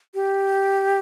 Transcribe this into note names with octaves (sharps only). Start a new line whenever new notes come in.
G4